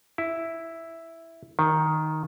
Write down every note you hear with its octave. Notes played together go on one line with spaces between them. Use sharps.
E4
D#3